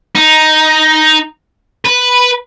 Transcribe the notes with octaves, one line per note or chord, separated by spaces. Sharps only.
D#4
B4